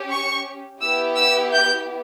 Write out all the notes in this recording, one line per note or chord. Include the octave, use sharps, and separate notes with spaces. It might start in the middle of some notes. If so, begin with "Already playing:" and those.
Already playing: C#4 G4
C#6
B3 E4 G4 E6
E6
G6